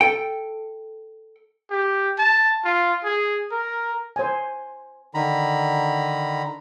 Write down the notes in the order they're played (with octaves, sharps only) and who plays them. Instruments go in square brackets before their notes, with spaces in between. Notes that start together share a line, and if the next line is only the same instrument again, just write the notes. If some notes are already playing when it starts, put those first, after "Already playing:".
[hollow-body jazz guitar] A4 G5
[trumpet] G4
A5
F4
G#4
A#4
[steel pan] C5 G#5
[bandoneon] D3 D#3 A#5 B5